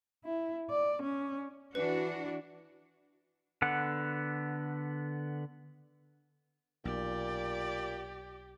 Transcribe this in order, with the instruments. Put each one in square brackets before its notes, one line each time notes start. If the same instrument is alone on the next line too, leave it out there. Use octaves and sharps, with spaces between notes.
[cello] E4
D5
C#4
[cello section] E3 D4 F#4 [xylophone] B4
[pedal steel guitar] D3 B3 F#5
[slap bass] B1 [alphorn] A#2 [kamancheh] G4 [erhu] D5